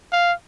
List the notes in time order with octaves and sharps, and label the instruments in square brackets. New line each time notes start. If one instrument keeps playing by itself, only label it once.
[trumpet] F5